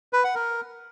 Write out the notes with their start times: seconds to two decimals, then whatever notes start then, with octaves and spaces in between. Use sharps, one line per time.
0.13 B4
0.24 F#5
0.35 A#4